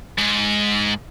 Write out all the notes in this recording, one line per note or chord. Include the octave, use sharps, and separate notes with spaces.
G#2